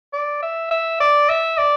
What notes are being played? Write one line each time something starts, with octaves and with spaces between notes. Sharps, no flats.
D5
E5
E5
D5
E5
D5